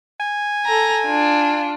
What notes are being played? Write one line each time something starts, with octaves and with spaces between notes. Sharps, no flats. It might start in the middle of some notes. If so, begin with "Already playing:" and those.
G#5
A4 A#5
D4 F4